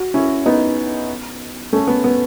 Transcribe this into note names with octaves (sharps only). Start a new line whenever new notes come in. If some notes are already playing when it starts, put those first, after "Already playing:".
Already playing: F#4
C#4 E4
B3 D#4
A3 C#4
B3
B3